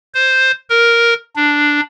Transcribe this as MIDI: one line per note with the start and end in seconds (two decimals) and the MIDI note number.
0.15 0.52 72
0.70 1.14 70
1.36 1.80 62